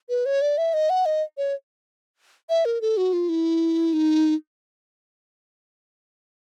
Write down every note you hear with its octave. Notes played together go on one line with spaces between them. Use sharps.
B4
C#5
D5
E5
D#5
F#5
D#5
C#5
E5
A#4
A4
F#4
F4
E4
D#4